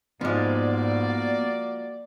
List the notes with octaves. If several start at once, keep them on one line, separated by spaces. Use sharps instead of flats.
G#2 F3 G#3 A#3 B3 F#4 D5 F6